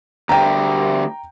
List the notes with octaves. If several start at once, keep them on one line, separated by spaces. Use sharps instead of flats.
D2 G3 G5 A#5